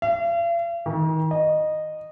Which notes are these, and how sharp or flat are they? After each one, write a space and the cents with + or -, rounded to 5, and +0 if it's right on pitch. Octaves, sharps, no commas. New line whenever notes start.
F5 -45
D#3 +35
D#5 -15